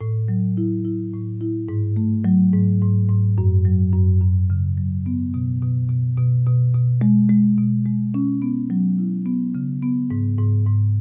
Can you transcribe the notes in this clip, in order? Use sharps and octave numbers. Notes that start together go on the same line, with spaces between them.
A2
F#3
E4
E4
A2
E4
G#2
A3
F#3
G#2
G#2
G#2
F#2
F#3
F#2
F#2
C#3
F#3
B3
B2
B2
B2
B2
B2
B2
G#3
G#3
B2
G#3
C#4
B3
F#3
E4
B3
C#3
B3
G#2
G#2
G#2